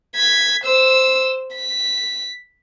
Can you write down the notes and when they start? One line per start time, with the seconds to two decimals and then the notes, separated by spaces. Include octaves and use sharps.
0.16 G#6 B6
0.64 C5 E6
1.55 B6